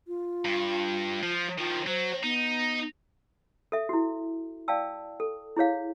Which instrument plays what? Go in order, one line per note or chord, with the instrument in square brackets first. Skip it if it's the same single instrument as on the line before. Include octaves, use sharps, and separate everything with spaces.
[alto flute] F4
[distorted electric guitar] G2
F3
[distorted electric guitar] D#3 F3 [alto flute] F4
[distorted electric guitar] F#3 [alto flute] C5
[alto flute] B3 [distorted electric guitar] D#4
[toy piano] A4 E5
E4 F#4
D5 F5 G5 A5 E6
A4
E4 G#4 C#5 F5